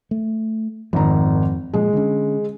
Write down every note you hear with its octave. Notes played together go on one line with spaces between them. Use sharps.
A3
G#1 F2 D#3 F3 A#5
A#2 F3 G#3
D3 C#4